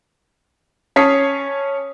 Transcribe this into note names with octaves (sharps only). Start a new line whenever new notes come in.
C#4 C#5 A5 D#6 B6 C7